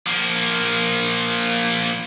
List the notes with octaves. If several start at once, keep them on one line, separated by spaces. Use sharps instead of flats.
F3 A#3